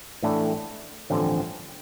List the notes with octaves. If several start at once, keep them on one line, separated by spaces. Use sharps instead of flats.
A1 A2 A3 D4
A1 G2 D3 F3 C4